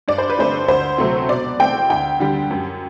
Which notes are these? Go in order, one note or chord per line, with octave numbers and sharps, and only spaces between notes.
G2 D5
C5
B4
D3 A3 C4 C5
D2 C5
C3 F#3 A3 C4
B2 D5
A3 C4 G5
D2 G5
D3 G3
F#2